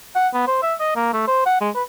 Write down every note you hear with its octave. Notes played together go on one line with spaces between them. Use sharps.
F#5
B3
C5
E5
D#5
A#3
A3
C5
F#5
G#3
B4